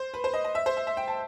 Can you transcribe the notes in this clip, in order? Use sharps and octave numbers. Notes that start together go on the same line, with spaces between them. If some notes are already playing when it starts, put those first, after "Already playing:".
Already playing: C5
B4
C5
D#5
D#5
E5
C5
E5
E5
G5
A5